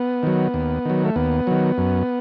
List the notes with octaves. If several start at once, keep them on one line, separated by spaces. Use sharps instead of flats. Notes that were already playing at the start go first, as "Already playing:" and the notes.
Already playing: B3
D#3 F#3
D#2
D#3 F#3
A3
D#2 B3
D#3 F#3
F#2